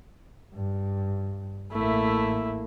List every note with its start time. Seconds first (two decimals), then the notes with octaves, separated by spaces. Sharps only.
0.54 G2
1.72 A1 A3 A#3 E4